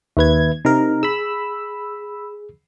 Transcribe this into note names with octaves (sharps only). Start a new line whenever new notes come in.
D#2 B4 E5 G#6
C3 D#4 A#4
G#4 B5 E6